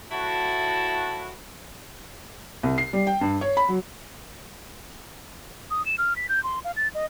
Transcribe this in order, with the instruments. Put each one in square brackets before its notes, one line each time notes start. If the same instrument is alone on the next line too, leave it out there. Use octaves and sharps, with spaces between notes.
[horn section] A2 E4 F#4 [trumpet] A5
[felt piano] C2
C7
G3
G5
G2
C#5
B5
F#3
[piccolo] D#6
E7
F6
B6
G6
C6
F5
A6
D#5